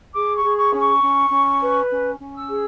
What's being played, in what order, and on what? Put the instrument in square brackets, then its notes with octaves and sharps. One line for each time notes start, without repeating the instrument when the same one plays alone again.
[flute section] G#4 D6
C#6
G#4
C#6
C#4
C#6
C#4
C#4
B4
C#4
C#4
E6
G#4